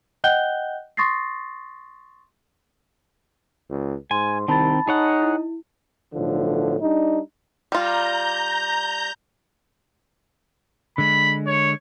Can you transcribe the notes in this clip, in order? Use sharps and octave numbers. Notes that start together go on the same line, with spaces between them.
D#5 F#5 G5 F#6 G6 G7
C6 C#6 D#6 A6 A#6 C7
C#2
G#2 G#5 C6
C2 D#3 C4 A5 B5 A6
D#4 G#4 C#5 F#5
E4
B1 A2 D3 F3
G3 D4 D#4
G3 F4 A#5 G6
D3 G#3 B5
C#5